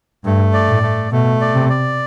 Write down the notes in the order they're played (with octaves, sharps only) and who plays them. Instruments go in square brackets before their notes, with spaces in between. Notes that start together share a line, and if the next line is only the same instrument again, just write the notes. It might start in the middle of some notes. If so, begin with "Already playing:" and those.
[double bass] G2 [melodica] A3
[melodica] D5
[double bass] A2
[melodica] A3
[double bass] B2 [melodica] A3
[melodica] D5
[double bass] C3
[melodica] D5